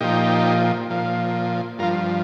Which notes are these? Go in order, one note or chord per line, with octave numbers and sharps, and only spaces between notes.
A#2 F3 D#4 G4
A#2 F3
G2 F3 F4 A#4